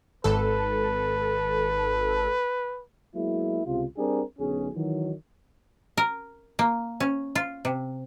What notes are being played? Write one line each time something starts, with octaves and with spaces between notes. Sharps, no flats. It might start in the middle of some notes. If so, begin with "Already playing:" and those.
G#1 A4 B4
F#3 G#3 A#3 B3 E4
C#2 C3 F4
G3 C4 D4 G4 G#4 A#4
B1 B2 D3 C#4 G#4
D#3 E3 F#3
A#4
A#3
C#4
F4
C3